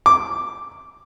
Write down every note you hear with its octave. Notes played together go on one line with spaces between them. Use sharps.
D6